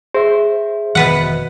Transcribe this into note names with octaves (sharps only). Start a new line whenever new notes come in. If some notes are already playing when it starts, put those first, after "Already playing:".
G#4 C5 E5
F1 B2 D#3 E3 B4 F#5